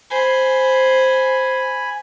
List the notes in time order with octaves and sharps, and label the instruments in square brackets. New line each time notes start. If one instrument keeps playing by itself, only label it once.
[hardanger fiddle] C5 [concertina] G#5 B5